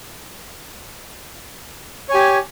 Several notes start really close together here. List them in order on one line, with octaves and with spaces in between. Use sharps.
C#5 G#5 G4